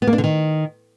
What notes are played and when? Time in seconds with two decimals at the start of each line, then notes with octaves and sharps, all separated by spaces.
0.02 B3
0.07 A#3
0.13 D4
0.18 D3
0.24 D#3